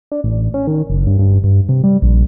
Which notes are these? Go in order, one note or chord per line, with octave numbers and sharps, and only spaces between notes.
D4
A1
C#4
D#3
F#1
G2
G2
G2
C3
G3
A#1